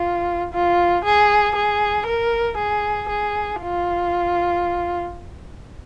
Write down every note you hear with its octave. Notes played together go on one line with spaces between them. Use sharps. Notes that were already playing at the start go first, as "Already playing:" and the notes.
Already playing: F4
F4
G#4
G#4
A#4
G#4
G#4
F4